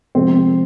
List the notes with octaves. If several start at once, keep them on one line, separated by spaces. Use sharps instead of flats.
C3 F3 G#3 C4